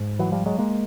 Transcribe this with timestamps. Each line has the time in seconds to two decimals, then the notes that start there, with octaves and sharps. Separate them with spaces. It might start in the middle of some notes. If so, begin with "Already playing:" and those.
Already playing: G#2
0.19 E3 F#3
0.32 F3 G3
0.46 F#3 G#3
0.58 G#3 A#3